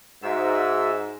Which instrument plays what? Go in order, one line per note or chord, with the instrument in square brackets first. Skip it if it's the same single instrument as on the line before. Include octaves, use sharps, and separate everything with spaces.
[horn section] G#2 [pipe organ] F#4 E5 E6